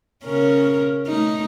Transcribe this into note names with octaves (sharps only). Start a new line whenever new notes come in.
C#3 C#4 A#4
A3 D#4